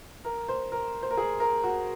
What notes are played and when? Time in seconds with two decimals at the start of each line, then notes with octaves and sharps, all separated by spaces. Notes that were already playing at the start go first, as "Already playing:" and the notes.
0.25 A#4
0.48 C5
0.72 A#4
1.03 C5
1.11 A#4
1.17 G#4
1.40 A#4
1.63 F#4